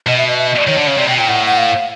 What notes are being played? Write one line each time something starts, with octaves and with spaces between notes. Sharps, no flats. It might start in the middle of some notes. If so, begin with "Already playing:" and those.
B2 D#5
E5
D#5
E5
D#5
D5
D#3 C#5
D3 D5
C#3 C#5
C3 D5
B2 G5
A#2 G5
A2 F#5
F#5
F5